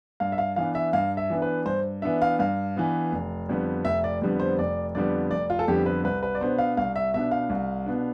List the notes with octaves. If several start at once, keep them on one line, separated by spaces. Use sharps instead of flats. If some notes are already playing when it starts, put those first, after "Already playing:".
G2 F5
E5
F5
E3 B3 D4 F5
E5
G2 F5
E5
E3 B3 D4
B4
G2 C5
E3 B3 D4 E5
F5
G2 F5
E3 B3 D4
F1
F2 D3 G3 B3
F1 E5
D5
F2 D3 G3 B3
C5
F1 D5
F2 D3 G3 B3 D5
F1 D5
F4
A4
F2 D3 G3 B3 G4
B4
C2 B4
B4
D5
B2 B3 D4 C5
F5
C2 F5
E5
B2 B3 D4 E5
F5
C2
B2 B3 D4